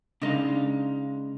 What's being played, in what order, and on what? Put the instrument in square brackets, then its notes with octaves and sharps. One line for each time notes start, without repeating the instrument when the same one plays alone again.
[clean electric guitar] C#3 G#3 F5 [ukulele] D4 D#4 D#5